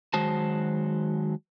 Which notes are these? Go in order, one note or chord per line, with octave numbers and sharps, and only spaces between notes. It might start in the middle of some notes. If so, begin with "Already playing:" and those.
D#3 F#3 G#3 F#4 C5 A5